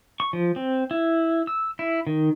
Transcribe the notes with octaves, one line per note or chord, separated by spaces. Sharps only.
C#6
F3
C4
E4
E6
E4
D#3